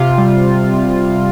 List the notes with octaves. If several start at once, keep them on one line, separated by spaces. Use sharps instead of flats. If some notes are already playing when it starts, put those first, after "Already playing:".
Already playing: C3 F4
G3